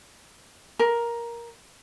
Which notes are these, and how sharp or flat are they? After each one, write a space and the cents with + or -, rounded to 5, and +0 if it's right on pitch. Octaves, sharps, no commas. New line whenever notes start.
A#4 +10